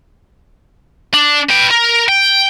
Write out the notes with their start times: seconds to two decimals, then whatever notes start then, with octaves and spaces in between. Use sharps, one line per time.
1.14 D4
1.50 B4 G5
1.71 A#4
2.08 G5